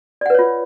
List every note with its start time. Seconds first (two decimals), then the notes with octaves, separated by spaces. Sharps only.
0.21 D5
0.26 F#5
0.30 B4
0.34 C#5
0.39 F4